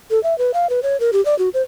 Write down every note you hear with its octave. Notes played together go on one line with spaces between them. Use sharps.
A4
E5
B4
F5
B4
C#5
A#4
G4
D5
F#4
C5